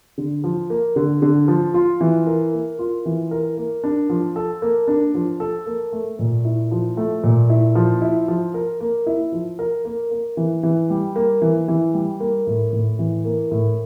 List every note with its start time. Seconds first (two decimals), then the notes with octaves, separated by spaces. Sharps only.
0.18 D3
0.44 F3
0.70 A#3
0.96 D3
1.22 D3
1.48 F3
1.74 F4
2.01 E3
2.26 A#4
2.53 A#3
2.79 F4
3.05 E3
3.31 A#4
3.57 A#3
3.84 D4
4.10 F3
4.36 A4
4.62 A#3
4.88 D4
5.15 F3
5.40 A4
5.66 A#3
5.93 A3
6.19 A#2
6.45 E4
6.71 F3
6.97 A3
7.24 A#2
7.50 E4
7.75 F3
8.02 E4
8.28 F3
8.54 A#4
8.80 A#3
9.07 E4
9.32 F3
9.59 A#4
9.85 A#3
10.11 A#3
10.37 E3
10.63 E3
10.90 G3
11.16 A#3
11.42 E3
11.68 E3
11.94 G3
12.20 A#3
12.47 A2
12.73 A2
12.99 E3
13.25 A#3
13.51 A2